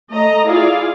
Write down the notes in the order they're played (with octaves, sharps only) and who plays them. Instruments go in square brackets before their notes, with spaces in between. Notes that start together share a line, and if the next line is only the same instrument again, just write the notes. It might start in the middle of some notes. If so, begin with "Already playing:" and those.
[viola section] A3 D#5 A#5
E4 F4 G#4 D5 F5